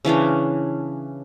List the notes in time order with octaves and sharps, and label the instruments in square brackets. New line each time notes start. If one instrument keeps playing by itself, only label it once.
[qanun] C#3 E3 C#4 D4